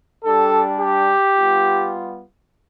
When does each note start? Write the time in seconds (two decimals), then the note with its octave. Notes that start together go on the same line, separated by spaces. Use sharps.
0.24 G3 D4 G4 A4
0.80 G4
1.35 G3 B3 F4